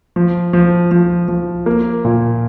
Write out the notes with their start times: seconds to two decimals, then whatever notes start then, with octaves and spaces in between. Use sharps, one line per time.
0.16 F3
0.53 F3
0.91 F3
1.28 F3
1.66 A#3
2.05 A#2